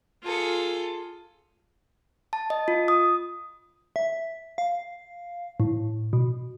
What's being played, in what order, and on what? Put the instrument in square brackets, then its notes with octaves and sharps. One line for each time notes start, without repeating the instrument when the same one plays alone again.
[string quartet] F4 G#4 A4
[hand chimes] A5
D#5
F4
D#6
[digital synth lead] E5
F5
A2
B2